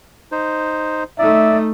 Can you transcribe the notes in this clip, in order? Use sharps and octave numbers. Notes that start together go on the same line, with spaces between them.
D#4 C5
A3 D#4 D5 E5